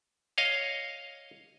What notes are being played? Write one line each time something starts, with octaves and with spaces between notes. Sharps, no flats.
C#5 D#5 F5